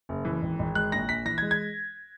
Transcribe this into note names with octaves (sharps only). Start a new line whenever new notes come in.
F#1
E3
G#1
G#1
G#3 F#6
A#1 A#6
A#1 B6
E3 A#6
G#6
G#3
G#6